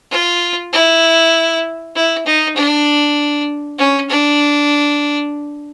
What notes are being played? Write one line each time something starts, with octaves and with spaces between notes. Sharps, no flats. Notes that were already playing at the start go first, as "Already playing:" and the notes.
F4
E4
E4
D#4
D4
C#4
D4